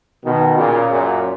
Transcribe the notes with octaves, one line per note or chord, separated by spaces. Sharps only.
B2 D#3
A#2 C#3
F#2 A#2